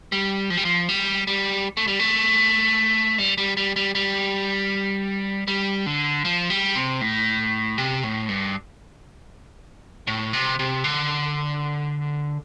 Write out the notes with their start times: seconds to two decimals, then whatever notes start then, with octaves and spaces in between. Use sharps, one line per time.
0.12 G3
0.50 F3
0.57 G3
0.65 F3
0.89 G3
1.27 G3
1.77 A3
1.87 G3
1.99 A3
3.18 G3
3.38 G3
3.57 G3
3.76 G3
3.95 G3
5.48 G3
5.86 D3
6.25 F3
6.50 G3
6.75 C3
7.01 A2
7.78 C3
8.03 A2
8.29 G2
10.07 A2
10.33 C3
10.59 C3
10.84 D3